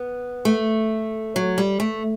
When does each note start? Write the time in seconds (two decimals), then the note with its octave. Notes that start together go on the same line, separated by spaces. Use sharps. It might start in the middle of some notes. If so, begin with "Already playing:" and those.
Already playing: B3
0.45 A3
1.36 F#3
1.58 G3
1.80 A3